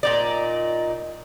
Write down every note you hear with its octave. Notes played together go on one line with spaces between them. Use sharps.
A#2 D#4 D5